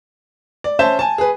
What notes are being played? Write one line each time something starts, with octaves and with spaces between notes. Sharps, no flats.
D5
C#4 C5 E5 A5 G6 E7
G#5 A5
G#4 B4